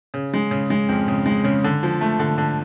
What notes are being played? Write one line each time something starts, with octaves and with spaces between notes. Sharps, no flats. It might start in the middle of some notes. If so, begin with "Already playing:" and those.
C#3
G#3
C#3
G#3
F2
C#3
G#3
C#3
D3
F3
A3
D3
D3